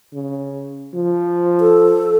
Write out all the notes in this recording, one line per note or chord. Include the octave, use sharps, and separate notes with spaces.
C#3
F3
A4